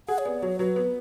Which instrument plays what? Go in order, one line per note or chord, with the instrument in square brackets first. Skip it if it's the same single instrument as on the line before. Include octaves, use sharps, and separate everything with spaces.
[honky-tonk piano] G#4 [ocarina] F#5
[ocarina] C#5
[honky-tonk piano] B3 [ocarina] D5
[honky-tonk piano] F#3 [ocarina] C#5
[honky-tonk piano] F#3 [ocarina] B4
[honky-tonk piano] B3